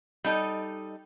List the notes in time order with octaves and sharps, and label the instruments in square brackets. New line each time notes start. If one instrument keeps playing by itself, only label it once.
[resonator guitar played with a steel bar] G3 D#4 A4 D#5